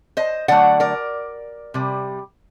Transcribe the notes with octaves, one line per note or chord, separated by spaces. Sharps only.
C5 D#5
D3 F#3 A3 D5 F#5
A#4 D5
C3 G3